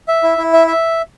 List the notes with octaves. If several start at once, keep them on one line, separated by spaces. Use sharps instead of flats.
E5
E4
E4
E5
E5